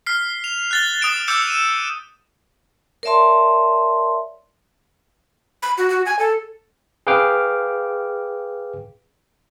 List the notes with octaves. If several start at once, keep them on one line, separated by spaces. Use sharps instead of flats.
F6 B6 C7
F7
F#6 A6 G7
D#6 A6 D7 E7
D6 E6 G6 C#7 E7 F7
D#7 E7
A#4 C#5 D5 E5 A5 C6
B5
F#4
F#4
G#5
A4
G#4 B4 F5 G5 D6 F6